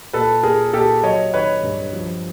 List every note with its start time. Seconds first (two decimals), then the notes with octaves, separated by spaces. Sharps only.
0.13 A#2 A4 B4
0.43 A#2 G#4 A#4
0.73 A#2 G4 A4
1.03 F#3 C#5 D#5
1.34 D#3 B4 C#5
1.63 G2
1.93 F3